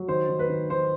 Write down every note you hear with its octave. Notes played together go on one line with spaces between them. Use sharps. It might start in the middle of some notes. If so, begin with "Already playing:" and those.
Already playing: F#3
D#3 C5
D#3
B4
D#3
D#3 C5